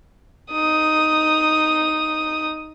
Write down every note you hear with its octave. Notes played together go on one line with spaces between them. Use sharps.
D#4 D#6